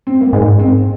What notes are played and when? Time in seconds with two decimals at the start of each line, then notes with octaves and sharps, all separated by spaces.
0.07 C4
0.21 A#3
0.33 G#2 G#3
0.60 C4